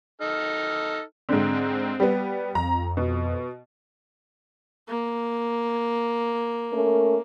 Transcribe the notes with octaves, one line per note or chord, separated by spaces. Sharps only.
D#4 A4 F6
G#2 D3 C4
G3 B3
F2 A#5
B2
A#3
A3 C#4 A#4